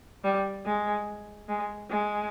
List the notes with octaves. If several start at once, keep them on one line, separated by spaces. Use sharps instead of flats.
G3
G#3
G#3
G#3